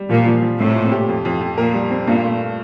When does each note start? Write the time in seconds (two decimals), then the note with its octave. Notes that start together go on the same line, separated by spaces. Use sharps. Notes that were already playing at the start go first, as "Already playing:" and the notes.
Already playing: G3
0.09 A#2 F3
0.26 F3
0.42 F3
0.59 A2 C3 A3
0.75 A#2
0.92 G4
1.09 F2
1.25 F2
1.41 F2
1.58 A#2 A#4
1.74 G3
1.91 C4
2.07 G2 A#2
2.23 A3